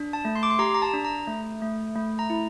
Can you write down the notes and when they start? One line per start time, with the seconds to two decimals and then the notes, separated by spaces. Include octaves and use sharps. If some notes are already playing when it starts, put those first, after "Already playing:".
Already playing: D4
0.13 A5
0.25 A3
0.36 C6
0.43 D6
0.50 C6
0.59 G4 A#5
0.74 A#5
0.82 A5
0.93 D4
1.05 A#5
1.27 A3
1.62 A3
1.96 A3
2.19 A#5
2.30 E4